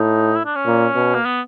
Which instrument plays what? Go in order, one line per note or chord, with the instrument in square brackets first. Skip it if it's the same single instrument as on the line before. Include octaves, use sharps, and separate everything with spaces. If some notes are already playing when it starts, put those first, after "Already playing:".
Already playing: [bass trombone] A2 [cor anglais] D#4
[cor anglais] E4
D4
C#4
[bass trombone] A#2
B2
[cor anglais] A#3
B3